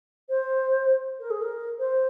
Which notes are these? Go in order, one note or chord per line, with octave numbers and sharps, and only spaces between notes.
C5
A#4
G#4
A#4
C5